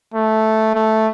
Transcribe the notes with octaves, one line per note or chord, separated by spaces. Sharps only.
A3
A3